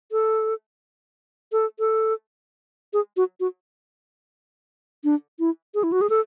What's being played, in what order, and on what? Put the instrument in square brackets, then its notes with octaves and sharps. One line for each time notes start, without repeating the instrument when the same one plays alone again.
[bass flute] A4
A4
A4
G#4
F#4
F#4
D4
E4
G#4
E4
F#4
G#4
A4